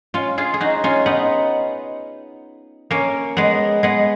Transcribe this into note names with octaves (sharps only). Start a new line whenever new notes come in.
C#4 F4
F4 G#4
G#4
D#4 F#4
C#4 F4
B3 D#4
A#3 C#4
G#3 B3
G#3 B3